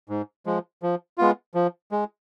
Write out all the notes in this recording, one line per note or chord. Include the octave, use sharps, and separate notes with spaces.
G#2
F3 G#3
F3
G#3 B3 F4
F3
G#3